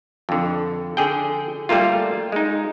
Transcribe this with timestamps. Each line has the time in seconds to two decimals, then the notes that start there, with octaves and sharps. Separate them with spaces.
0.29 F2 D3
0.97 D3 G#4 G5
1.69 G3 A3 A#3 F4
2.32 G#3 D#4